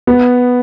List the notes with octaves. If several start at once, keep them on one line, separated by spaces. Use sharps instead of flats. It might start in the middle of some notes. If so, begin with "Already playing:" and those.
B3